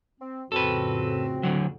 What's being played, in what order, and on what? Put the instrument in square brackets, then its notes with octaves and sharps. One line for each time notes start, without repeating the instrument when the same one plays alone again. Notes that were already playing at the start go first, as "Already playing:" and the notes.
[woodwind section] C4
[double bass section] F2 A2 C#3 [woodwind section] C4 F#4 [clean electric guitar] A4 B4
[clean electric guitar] D2 D3 F#3